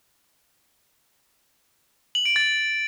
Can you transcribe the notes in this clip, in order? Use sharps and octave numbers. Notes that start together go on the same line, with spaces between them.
F#7
D7
A6